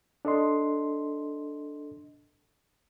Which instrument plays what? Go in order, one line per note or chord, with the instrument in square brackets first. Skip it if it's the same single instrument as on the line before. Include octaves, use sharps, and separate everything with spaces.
[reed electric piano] D4 A4 D#5 C6